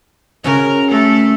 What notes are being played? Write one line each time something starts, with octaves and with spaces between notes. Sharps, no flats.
C#3 C#4 F#4 A#4
A3 A4